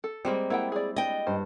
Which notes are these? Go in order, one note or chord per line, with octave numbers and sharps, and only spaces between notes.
A4
G3 G#3 A#3 C4
A#3 E4 F#5 G5
G#4 D5
D4 D#5 G5
G2 C5